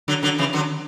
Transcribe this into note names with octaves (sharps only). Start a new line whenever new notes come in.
D3 F#3
D3 F#3
C#3 E3
D3 F#3